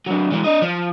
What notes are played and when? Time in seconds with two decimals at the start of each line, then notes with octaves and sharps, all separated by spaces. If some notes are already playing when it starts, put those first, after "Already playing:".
0.07 F#3 D4
0.32 E3 G#3
0.44 D4 D#5
0.62 F3